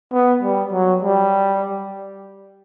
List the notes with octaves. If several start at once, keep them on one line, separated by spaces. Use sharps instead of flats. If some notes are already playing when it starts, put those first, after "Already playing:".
B3
G3
F#3
G3